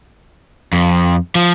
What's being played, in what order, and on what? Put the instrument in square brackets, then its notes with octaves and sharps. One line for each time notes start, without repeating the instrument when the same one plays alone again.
[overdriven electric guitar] F2
F3